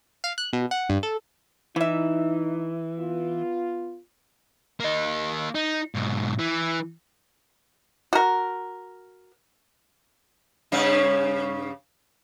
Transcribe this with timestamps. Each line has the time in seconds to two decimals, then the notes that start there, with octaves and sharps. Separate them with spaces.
0.24 F5
0.38 F#6
0.53 B2
0.71 F#5
0.89 G2
1.03 A4
1.76 E3 D#4 E4 E5
2.98 B3 F4
4.80 A#3 D#5
5.55 D#4
5.95 G#2 B2
6.39 E3
8.13 F#4 A#4
10.72 G2 C#3 C#4